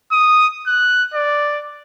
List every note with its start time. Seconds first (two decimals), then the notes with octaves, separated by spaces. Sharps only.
0.12 D#6
0.67 F#6
1.14 D5